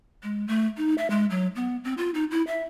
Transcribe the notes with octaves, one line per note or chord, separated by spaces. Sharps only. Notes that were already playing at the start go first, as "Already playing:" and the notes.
G#3
A3
D#4
E5
G#3
F#3
B3
C4
F4
D#4
E4
E5